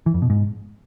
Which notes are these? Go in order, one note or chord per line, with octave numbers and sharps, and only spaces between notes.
E3
F2
B2
G#2